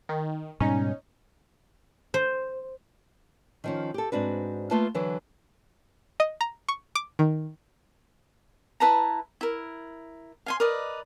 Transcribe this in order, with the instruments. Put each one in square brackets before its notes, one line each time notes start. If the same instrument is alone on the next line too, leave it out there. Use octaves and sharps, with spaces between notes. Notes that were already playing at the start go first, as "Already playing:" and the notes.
[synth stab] D#3
[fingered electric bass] G#2 B2 G3 [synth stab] C#4 D#4
[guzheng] C5
[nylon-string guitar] D#3 F3 C#4
G4 A4
G#2 C4 D4 F#4 B4
A3 A#3 F4 B4 A5
D3 E3 F#3 B4
[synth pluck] D#5
A#5
C#6
D6
D#3
[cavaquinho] E4 B4 A5 A#5
E4 A#4
F5 G#5 C6
A#4 B4 D5 D#5